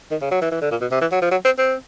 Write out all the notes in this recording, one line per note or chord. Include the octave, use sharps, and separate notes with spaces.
D#3
C#3
F#3
E3
E3
D3
A#2
B2
C3
E3
F#3
F3
F#3
C4
C4